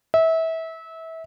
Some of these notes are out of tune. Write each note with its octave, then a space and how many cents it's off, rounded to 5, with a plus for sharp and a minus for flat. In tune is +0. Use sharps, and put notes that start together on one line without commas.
E5 -25